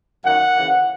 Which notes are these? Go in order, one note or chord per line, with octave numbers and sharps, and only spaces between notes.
F#2 D#3 A#3 F#5
C#3 E3 A#3